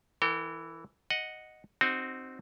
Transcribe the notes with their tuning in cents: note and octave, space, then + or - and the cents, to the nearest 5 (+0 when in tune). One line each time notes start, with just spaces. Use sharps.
E3 +0 A#4 -45 G5 -25
D#5 +0 F#5 -5
C4 +0 D#4 -20 F#4 +0